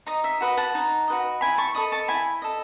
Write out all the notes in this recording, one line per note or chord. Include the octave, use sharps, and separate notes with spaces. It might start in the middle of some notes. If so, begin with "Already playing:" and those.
D#4 D#5
E5
F#4 B4 D#5
F#5 A5
D#4
F#4 B4 D#5
E4 G#5 B5
A5 C#6
A4 D#5 B5 D#6
A5 C#6
E4 G#5 B5
A4 D#5